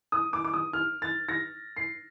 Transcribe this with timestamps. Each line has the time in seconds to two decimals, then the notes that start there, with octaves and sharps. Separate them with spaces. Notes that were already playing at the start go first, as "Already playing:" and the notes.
0.12 D#6
0.33 D6
0.44 D6
0.54 D#6
0.73 F6
1.02 A6
1.29 A#6
1.76 C7